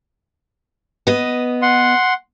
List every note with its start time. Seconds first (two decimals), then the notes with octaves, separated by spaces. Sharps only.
1.07 B3 D#5
1.62 F#5 C6